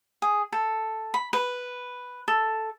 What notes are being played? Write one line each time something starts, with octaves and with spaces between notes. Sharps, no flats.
G#4
A4
B5
B4
A4